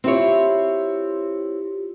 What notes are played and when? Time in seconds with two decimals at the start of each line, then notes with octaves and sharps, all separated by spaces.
0.04 C4 E4 F4 G4 C#5